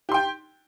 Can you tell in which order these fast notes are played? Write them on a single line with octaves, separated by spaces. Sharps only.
G4 C6 G5